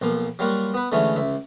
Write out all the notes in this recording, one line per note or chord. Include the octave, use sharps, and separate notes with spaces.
B1 F3 A#3
F#3 G3 A#3 F4 F#4
B3 B4
D3 E3 G#3 A3 C#4
C#2 E5